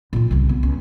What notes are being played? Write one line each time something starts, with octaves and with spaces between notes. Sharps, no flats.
A#2 F4
C2 C#3
B3
C#2